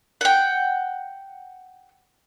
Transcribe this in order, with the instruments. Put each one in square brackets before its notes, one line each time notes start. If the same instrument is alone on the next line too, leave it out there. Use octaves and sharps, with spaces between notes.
[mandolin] F#5 G5